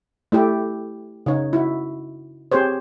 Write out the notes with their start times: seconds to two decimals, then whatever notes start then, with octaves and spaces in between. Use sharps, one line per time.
0.32 A3 E4 G4 A4
1.26 C#3 D#4 C#5
1.53 E4 F#4
2.52 C4 G4 G#4 C5 C#5